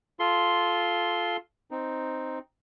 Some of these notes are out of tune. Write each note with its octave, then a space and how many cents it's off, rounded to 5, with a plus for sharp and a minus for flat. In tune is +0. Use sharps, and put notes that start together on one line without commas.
F4 +0 A4 -20 C6 +0
C4 +0 D#4 +0